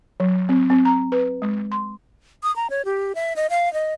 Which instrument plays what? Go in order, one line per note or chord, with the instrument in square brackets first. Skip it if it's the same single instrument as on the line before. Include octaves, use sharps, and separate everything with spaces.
[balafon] F#3
C4
C4
A#5
B4
G#3
C6
[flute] D#6
A#5
C#5
G4
E5
D#5
F5
D#5